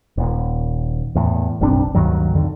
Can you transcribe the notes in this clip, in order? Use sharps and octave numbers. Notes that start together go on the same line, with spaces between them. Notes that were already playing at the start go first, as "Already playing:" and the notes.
D#1
E2 A2
F#1 B1 C4 D4
D2 G2 D#3 F#3
F2 D3 D#3